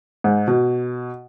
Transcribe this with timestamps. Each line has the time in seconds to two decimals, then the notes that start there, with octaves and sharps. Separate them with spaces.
0.24 G#2
0.47 B2